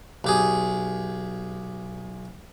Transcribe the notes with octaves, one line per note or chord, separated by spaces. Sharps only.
B1 G4 G#4